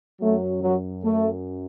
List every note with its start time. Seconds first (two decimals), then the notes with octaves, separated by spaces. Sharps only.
0.20 F#2 F#3 A3
0.62 F#3
1.03 A3